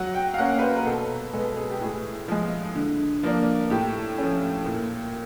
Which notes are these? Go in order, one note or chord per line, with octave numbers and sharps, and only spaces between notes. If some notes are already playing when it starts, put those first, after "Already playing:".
Already playing: F#3 F#5
G5
F5
A#3 C#4 F#5
B4
C5
A#4
B2 A4
G#3 B3 A4
G#4
G4
A2 G#4
F3 G#3
D3
F3 A#3 D4
A2 G4
F3 A3 C#4
A#2